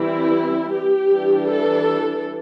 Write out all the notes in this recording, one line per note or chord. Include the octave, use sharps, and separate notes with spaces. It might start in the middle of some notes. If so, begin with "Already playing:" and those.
Already playing: E3 G3 C4 E4
G4
E3 G3 D4
A4